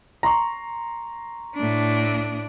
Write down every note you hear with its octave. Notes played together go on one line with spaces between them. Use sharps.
A#5 C6 C#6
A2 D4